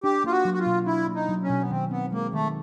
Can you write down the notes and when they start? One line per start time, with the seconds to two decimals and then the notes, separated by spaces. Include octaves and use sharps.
0.04 D4 G4
0.24 A#3 F4
0.31 F#4
0.45 F#3
0.54 F#4
0.59 F4
0.66 B2
0.86 D4 E4
1.08 A#3
1.15 D#4
1.29 F#3
1.43 C#4
1.50 B2
1.61 B3
1.70 D#3 C4
1.91 B3 C4
2.12 G#3 A#3
2.33 D#3 A3